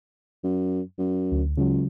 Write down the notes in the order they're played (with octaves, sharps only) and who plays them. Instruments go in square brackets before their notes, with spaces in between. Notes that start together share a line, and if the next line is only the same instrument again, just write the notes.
[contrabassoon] F#2
F#2
[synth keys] D2
[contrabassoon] C#2 [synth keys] C#3 F#3